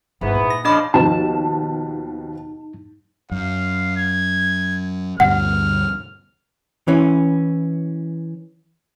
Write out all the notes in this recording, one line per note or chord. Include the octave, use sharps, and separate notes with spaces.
G1 G#2 E3 B3
A#2
A#6
C#3 F3 D4 D#5 B5 D6
D#2 B2 F3 D#4 A5
F#2 F5
G#6
D2 G2 B2 F#5 F6
E3 C#4